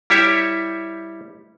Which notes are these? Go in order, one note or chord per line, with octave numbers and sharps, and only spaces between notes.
G3 E4 G4 C#5 E5